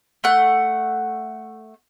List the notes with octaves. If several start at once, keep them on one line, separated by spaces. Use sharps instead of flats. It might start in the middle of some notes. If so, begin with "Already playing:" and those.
A3 F#5